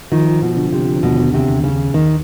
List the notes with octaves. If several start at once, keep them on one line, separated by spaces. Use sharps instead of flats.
D#3 F3
B2
D3
C3
D#2 B2
C3
D#2
C#3
D#2 D#3